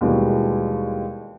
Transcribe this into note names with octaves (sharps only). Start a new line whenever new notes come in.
D#2 B2 E3 G3 G#3